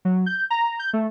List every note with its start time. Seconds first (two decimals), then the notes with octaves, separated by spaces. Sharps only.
0.05 F#3
0.26 G6
0.50 A#5
0.79 G6
0.93 A3